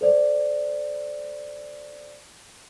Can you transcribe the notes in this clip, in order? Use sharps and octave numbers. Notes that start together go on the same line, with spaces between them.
A4 C5 D5